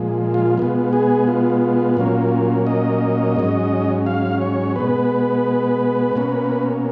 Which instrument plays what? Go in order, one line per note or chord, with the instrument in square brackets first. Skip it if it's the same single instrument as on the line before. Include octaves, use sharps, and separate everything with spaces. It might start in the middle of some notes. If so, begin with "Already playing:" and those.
Already playing: [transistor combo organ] A#2 F3 G#3
F4
B2 G#3 B3 F4
G#4
F4
A#2 F#3 A#3 C#4
D#5
G#2 F#3 C#4
F5
C#5
B2 G#3 B3 B4
B2 A#3 C#4